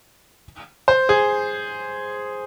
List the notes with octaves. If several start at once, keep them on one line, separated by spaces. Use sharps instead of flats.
C5
G#4